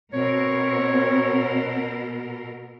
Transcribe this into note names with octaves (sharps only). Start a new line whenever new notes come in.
B2 C4 A#4 C#5